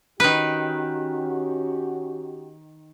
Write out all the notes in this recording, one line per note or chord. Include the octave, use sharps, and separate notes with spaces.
D#3 C#4 F#4 G4 B4